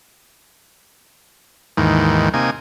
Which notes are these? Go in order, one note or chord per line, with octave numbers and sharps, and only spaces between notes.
D#2 G#2 D#3 E3
C3 A#3 D#4 G#5